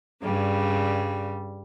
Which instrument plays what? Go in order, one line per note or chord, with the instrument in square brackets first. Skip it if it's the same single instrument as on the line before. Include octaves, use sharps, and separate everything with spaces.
[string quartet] G2 C#3 G3